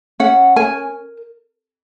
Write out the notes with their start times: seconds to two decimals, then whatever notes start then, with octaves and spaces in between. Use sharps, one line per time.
0.20 C#4 F#5
0.56 A#4 G#5